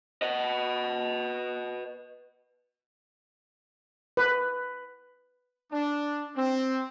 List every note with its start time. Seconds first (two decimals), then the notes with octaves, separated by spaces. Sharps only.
0.22 B4 D#5
4.17 B4
5.71 D4
6.36 C4